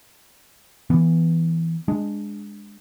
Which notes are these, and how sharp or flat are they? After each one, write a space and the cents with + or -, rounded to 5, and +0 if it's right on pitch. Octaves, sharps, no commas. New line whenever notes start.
E3 +0 B3 +0
G#3 -15 D4 +0